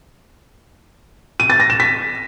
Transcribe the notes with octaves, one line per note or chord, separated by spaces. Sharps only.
D#7
A6
A#6
E7
B6